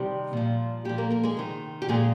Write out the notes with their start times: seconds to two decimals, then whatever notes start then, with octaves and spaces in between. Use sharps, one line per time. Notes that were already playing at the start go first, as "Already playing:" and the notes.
Already playing: C3 D#3 G3 G4
0.33 A#2 F3
0.85 A#2 F3 G3 G4
0.98 A#3 A#4
1.10 A#3 A#4
1.23 G#3 G#4
1.37 C3 D#3
1.82 G4
1.88 A#2 F3 G#3 G#4